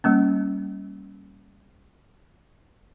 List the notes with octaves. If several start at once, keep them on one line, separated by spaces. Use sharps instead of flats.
G3 A#3 C#4